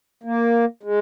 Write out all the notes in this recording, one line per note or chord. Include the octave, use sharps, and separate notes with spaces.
A#3
G#3